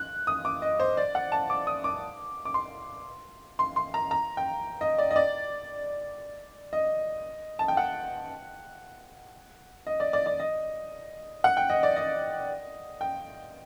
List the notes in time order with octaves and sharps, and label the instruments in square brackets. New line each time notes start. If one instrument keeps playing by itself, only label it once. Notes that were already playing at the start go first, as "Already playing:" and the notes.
Already playing: [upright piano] F#6
D#6
D6
D#5
C5
D5
F#5
A5
D6
D#6
D6
D6
C6
C6
C6
A#5
A#5
G5
D#5
D5
D#5
D5
D#5
A5
G5
F#5
D#5
D5
D5
D5
D#5
F#5
G5
D#5
D5
D#5
G5